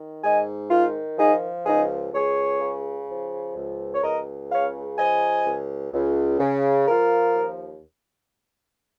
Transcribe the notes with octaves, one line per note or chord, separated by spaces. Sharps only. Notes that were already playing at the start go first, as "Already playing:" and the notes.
Already playing: D#3
G#2 D#5 G#5
D#3 F4
F3 D#4 G#4
C#2 D#4 G#4
C#2 G#4 C#5
C#3
F3
C#2
C#5
C#2 A#4 D#5
C#3 C#5 F5
F3 D#5 G#5
C#2
C#2
C#3
F3 F4 A#4
D#2